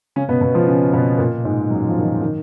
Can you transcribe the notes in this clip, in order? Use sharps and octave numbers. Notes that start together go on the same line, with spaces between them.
C#3 C#4
B2 B3
B2 B3
F3 F4
C#3 C#4
B2 B3
A#2 A#3
G#2 G#3
F#2 F#3
F3
D#3
F3
D#3